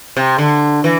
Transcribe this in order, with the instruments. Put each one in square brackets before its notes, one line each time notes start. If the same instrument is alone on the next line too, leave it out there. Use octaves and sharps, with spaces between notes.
[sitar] C3
D3
E3